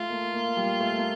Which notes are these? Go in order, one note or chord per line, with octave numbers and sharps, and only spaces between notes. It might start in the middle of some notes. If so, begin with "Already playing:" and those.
Already playing: A3 F4
A#3
A#3
G3
A3
A#3